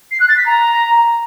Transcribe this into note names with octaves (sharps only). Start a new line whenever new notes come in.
C7
F#6
A6
B6
A#5